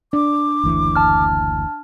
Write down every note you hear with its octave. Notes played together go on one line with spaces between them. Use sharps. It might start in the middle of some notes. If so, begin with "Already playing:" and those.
D4 D6
F#1 D2 E3
A5 F6